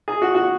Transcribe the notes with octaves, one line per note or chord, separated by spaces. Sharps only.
G#4
F#4
F#4